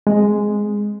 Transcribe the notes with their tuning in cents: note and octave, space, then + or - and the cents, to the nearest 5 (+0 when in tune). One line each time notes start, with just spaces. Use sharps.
G#3 +0 C4 +0